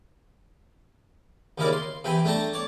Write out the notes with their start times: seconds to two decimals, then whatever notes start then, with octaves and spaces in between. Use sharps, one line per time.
1.58 D#2 C#3 E4 A#4 D5
1.73 C6
2.04 C3 E3 G5 B5
2.25 A3 D4 G5 A5 A#5
2.53 C#5 D5